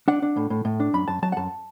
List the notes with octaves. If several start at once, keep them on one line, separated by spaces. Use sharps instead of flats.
D4 F#5
D4
A2
A2
A2
D4
F#2 B5
F#2 A5
F#3 A5
F#5
F#2 A5